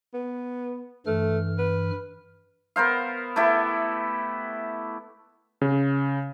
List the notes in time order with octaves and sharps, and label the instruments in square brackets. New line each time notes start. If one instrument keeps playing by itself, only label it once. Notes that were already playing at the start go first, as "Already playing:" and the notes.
[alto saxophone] B3
[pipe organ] G2 E3 F6 [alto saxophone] A3
[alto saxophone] B4
[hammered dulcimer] B3 A#4 C5 F5
A3 B3 E4 G4
[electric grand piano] C#3